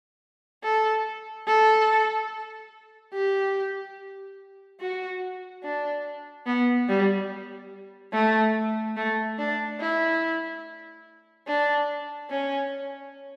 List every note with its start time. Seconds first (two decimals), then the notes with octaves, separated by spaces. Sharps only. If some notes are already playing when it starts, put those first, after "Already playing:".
0.64 A4
1.47 A4
3.14 G4
4.81 F#4
5.64 D4
6.47 B3
6.89 G3
8.13 A3
8.97 A3
9.39 D4
9.80 E4
11.47 D4
12.31 C#4